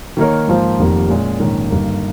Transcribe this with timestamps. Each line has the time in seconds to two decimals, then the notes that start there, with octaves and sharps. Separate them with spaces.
0.17 D#3 A#3 D#4 A#4 C#5
0.47 G#2 F3 A#3 F4 C5
0.79 F1 F2 D#3 G3 A#3
1.09 A#2 G#3 C#4 G#4
1.40 A#1 G#2 D#3 A#3 C#4
1.70 G1 G2 D#3 G3 A#3